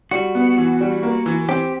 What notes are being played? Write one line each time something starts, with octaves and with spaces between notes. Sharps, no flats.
G3 F#4
B3
E3
G3
A#3
E3
C4 G4